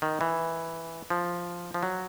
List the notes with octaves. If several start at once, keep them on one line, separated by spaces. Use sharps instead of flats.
D#3
E3
F3
F3
F#3